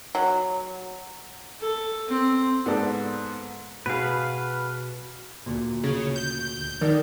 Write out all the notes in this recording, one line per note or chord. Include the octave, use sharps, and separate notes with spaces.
F#3
A4
C4
G#2 B3 A4 D5
B2 G#4 B4 F5
D2 A#2
C#3
G6
D#3 D#4 A#4 D5